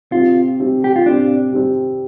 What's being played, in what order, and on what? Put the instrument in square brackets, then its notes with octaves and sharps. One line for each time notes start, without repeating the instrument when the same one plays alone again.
[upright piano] C3 G3 C4 [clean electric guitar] F4
[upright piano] C3 G3 C4
[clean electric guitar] G4
F4
[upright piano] C3 G3 C4 [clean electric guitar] D4
[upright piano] C3 G3 C4